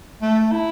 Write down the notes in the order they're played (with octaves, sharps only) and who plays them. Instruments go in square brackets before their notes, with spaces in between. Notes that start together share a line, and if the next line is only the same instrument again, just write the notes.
[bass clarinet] A3
E4